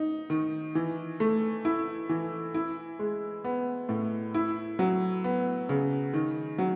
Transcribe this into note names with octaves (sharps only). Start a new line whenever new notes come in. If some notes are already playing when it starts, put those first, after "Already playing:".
Already playing: D#4
D#3
E3
A3
E4
E3
E4
G#3
B3
A2
E4
F#3
B3
C#3
D#3
F#3